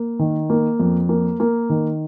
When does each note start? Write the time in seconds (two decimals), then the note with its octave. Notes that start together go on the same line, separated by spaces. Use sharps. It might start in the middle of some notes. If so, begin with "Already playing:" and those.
Already playing: A#3
0.19 D#3
0.50 A#3
0.79 F2
1.09 A#3
1.40 A#3
1.70 D#3